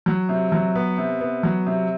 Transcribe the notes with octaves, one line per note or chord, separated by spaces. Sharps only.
F#3
C3
F#3
B3
C3
B3
F#3
C3